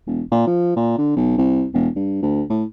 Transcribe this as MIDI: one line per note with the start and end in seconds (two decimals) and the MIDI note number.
0.07 0.22 28
0.32 0.43 46
0.47 0.75 53
0.76 0.94 46
0.98 1.14 50
1.17 1.34 35
1.38 1.66 36
1.74 1.88 28
1.96 2.19 43
2.23 2.43 38
2.50 2.64 45